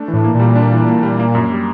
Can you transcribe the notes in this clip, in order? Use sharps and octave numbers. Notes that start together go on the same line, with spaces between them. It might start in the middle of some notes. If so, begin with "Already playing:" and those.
Already playing: A3 D4
E3
A2
A#3
A#2
G3
D4
E3
A#3
G3
A#3
F#2
G3